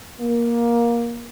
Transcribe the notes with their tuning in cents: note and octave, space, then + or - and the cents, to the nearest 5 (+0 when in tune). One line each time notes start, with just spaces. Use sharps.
A#3 +15